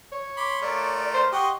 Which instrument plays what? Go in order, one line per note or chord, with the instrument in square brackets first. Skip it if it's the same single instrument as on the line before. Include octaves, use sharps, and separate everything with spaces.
[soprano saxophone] C#5
[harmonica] B5 C6 [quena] D6
[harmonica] A3 F4 A#4 [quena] D5
[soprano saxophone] C5
[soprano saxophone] G4 [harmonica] D#5 F#5 C6 [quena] C#6